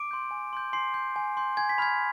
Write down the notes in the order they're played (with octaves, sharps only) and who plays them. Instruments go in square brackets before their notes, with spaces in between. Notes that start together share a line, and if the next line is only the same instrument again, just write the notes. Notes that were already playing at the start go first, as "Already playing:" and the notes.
Already playing: [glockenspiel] D6 D7
C6 G6
G#5
C6 G6
G#5 C6 C7
C6 G6
G#5
C6 G6
G#5 G#6
B6
B5 F6 G#6